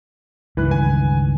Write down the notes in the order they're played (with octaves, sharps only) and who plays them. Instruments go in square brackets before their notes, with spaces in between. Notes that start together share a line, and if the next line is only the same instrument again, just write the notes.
[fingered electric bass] C#2 G2 D#3 [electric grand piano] E3 B4 F#6
[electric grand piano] G#5